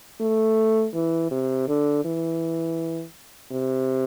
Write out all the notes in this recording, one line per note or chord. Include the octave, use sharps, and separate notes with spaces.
A3
E3
C3
D3
E3
C3